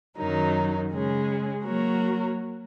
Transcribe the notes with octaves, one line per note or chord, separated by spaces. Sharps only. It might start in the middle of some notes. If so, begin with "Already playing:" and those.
F#2 D#3 F#3 D#4 A#4
C#3 G#3 C#4 G#4
F#3 A#3 F#4 A#4 C#5